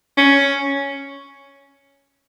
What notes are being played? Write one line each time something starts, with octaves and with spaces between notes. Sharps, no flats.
C#4